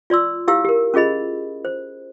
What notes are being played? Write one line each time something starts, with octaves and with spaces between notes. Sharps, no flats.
F4 D5 C6 E6
E4 G4 F5 E6
G4 A#4
C#4 F4 G#4 D#5 B5
C5